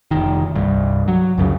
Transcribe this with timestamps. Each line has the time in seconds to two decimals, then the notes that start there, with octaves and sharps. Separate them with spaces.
0.11 F1 D#3
0.56 C2 G2
1.08 F#3
1.38 C#2 F#2 C#3